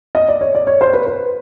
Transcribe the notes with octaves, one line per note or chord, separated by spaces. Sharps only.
D#5
D5
C#5
D5
C#5
C5
B4
B4